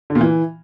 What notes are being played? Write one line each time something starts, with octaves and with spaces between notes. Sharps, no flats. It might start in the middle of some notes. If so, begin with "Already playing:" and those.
D3
A#2
E3